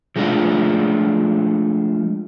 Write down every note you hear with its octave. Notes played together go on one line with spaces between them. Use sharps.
F3 G#3 A3 B3 D4 F4